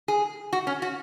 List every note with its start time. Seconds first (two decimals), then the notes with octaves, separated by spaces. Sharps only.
0.08 G#4
0.53 F#4
0.67 C#4
0.82 F#4